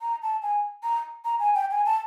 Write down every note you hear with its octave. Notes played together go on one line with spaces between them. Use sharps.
A#5
A5
G#5
A#5
A#5
G#5
G5
G#5
A5